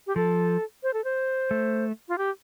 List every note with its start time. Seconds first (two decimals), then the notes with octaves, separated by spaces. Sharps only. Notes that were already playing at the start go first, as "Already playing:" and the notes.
0.07 G4
0.16 F3 A4
0.83 C5
0.94 A4
1.04 C5
1.51 A3
2.09 F4
2.18 G4